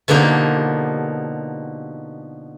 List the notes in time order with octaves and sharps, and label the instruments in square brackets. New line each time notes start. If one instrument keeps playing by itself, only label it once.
[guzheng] B2 D3 F3 A#3 D#4 G4